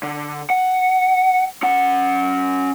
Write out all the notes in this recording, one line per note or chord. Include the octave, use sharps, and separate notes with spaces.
D3
F#5
C#4 F#5